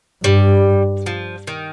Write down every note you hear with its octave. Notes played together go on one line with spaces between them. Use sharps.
G2 G3
F3
D#3